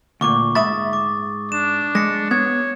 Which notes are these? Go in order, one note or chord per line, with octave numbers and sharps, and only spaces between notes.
D2 A#2 C#6 D6
G#2 E5 B5 D#6 A6
D6
D4 E7
G#3 A#6 C#7
B3 C#5 G#6